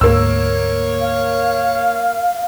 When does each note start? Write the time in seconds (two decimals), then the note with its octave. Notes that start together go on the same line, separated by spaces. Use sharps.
0.01 D2 G#2 A#3 C#5 E6
1.01 F5